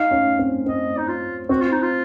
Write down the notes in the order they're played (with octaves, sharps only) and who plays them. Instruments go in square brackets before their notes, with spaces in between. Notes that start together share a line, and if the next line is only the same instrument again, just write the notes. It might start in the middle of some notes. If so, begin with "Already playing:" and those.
Already playing: [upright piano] D#4 [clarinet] F5
[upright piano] C#4
C4
[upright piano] C4 [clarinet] D#5
[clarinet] D#4
F4
[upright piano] C4 [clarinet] F#4
[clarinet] F4
D#4
F4